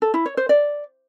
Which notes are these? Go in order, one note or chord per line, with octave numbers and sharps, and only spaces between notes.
A4
E4
C#5
C5
D5